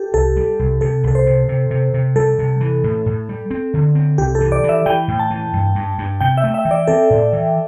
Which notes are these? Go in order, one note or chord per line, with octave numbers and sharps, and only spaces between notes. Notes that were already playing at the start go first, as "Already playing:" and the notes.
Already playing: G4 A4
C2 A4
G3
C2
C3 A4
C2 A4
C5
C3
C3
C3
C3
G3 A4
C3
E3
A2
A2
G3
C4
D3
C4
C2 G4
A4
E3
D5
E3
E5
E3 G5
A2
A5
E3
G2
G2
G2
C3 G5
E5
A3
E5
E3
D5
C4 A4
A2
E3